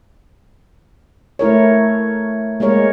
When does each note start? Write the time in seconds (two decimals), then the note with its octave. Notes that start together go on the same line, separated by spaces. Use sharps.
1.39 A3 E4 A#4 C#5
2.60 G#3 A#3 A#4 C#5